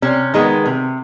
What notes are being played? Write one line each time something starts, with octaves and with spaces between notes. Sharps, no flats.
C3 C#4
D#3 G#3 B3
C3